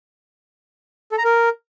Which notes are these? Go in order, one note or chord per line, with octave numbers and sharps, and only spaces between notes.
A4
A#5
A#4